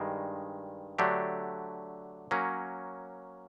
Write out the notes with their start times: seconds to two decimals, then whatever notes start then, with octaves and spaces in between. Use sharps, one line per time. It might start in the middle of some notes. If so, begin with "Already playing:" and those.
Already playing: G2 D#3 G#3
0.99 D3 F#3 A3 D4 G4
2.31 F#3 A#3 C#4